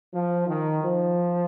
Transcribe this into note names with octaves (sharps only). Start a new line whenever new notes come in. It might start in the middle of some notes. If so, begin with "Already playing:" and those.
F3
D#3
F3